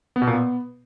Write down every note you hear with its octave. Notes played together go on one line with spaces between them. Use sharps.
B3
B2
A#2
B3